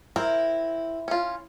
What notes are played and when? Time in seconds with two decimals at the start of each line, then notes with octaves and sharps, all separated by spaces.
0.16 C4 E4 A#4
1.08 C#4 F4